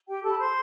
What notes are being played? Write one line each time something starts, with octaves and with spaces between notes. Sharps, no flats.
G4 G5
A4 A5
B5
C5 C6